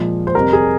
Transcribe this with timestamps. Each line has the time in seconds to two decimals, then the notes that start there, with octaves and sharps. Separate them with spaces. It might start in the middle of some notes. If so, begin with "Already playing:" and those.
Already playing: A#2 F3 G#3
0.27 C5
0.35 F2 C3 G3 A#4
0.53 G#4